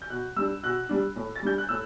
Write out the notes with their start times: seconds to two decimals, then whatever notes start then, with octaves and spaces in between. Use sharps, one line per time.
0.02 G6
0.10 B2 F#6
0.36 G3 D4 E6
0.63 B2 F#6
0.89 G3 D4
1.16 A2
1.35 A6
1.43 G3 D4 G6
1.58 F#6
1.69 A2 E6